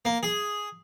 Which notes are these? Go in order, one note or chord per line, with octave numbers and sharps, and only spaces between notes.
A#3
G#4